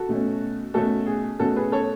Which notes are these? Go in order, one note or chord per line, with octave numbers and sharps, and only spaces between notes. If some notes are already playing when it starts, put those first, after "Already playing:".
Already playing: F#4 A4
B2 A3 C#4
B2 A3 C#4 F#4 A4
G#4
B2 A3 C#4 F#4 A4
G#4 B4
A4 C#5